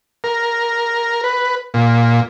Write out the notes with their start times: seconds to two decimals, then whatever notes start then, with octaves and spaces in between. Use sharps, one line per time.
0.24 A#4
1.24 B4
1.74 A#2